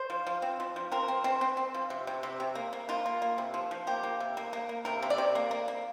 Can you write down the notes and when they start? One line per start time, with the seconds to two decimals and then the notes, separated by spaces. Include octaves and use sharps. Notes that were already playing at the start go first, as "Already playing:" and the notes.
Already playing: C5
0.10 F3
0.27 F3
0.42 C4
0.60 F3
0.76 F3
0.91 C4 A#4
1.08 C4
1.24 C4
1.41 C4
1.57 C4
1.74 F3
1.90 C3
2.07 C3
2.23 C3
2.40 C3
2.55 A#3
2.73 A#3
2.89 A#3 F4
3.06 A#3
3.22 A#3
3.38 C3
3.54 F3
3.71 F3
3.87 A#3 G4
4.03 A#3
4.20 C3
4.37 A#3
4.53 A#3
4.69 A#3
4.85 C3 A#4
5.02 C3
5.10 D5
5.18 C3
5.35 A#3
5.51 A#3
5.68 A#3